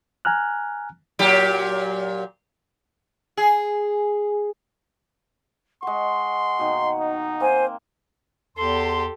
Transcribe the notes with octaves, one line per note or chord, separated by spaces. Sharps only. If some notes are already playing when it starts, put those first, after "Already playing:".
G#5 A#5 F6 F#6
A#2 F#3 G4
G#4
G#3 F#5 C6 C#6
B2 D#3 A#3
D#4
A#3 C4 C5 G#5
E2 G4 A4 C6